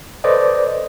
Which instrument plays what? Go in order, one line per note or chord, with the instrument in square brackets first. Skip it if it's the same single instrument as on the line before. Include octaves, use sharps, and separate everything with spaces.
[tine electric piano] A4 B4 C5 D5 D#5